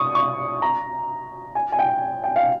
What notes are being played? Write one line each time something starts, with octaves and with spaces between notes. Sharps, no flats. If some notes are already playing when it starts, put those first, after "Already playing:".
Already playing: C#6 D#6
C#6
A#5
G#5
G#5
G5
G5
F5